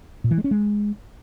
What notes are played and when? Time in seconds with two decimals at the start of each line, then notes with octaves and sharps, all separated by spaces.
0.24 A#2
0.31 E3
0.38 G#3
0.44 C#4
0.51 G#3